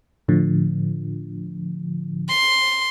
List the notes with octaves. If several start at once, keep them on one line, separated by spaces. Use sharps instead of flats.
A2 D3 F3
C6